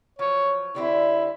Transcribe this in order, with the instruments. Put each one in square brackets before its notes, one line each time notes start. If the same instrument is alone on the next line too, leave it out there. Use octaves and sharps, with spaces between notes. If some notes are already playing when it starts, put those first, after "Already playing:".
[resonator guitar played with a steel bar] F3 F#3 [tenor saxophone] C#5
[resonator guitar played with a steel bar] D3 G3 C4 [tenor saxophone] E4